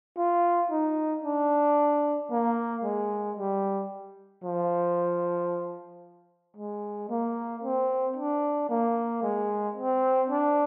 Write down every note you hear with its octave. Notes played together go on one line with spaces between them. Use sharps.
F4
D#4
D4
A#3
G#3
G3
F3
G#3
A#3
C4
D4
A#3
G#3
C4
D4